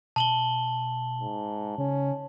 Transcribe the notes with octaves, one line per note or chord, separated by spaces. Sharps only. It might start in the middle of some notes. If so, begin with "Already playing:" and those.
B2 A5 F#7 G7
G#2
C#3 C#4